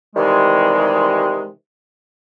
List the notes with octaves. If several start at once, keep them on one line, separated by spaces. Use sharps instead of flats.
C3 D#3 E3 G3 G#3